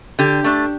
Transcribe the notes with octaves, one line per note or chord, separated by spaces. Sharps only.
D3 G4
A3 D4